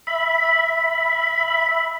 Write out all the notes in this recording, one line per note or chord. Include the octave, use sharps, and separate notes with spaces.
E5 B5